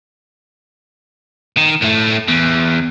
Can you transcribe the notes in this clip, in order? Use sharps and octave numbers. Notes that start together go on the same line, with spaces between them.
D#3
A2 A3
E2